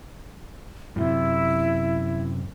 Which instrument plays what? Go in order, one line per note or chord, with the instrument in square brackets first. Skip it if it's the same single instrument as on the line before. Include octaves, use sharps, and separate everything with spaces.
[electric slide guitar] F#2 A2 C3 [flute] E4